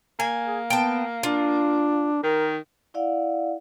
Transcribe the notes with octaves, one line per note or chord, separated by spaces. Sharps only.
A#3 G#5
G#4
B3 G5 A5
D4 F4
D#3 A#4
E4 D5 F5 F#5